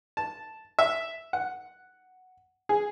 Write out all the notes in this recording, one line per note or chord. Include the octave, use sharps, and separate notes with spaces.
A5
E5
F#5
G#4